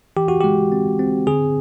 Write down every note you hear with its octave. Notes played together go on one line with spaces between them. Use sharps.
E3 G4
F#4
G#3 G4
C4
C4
D3 G#4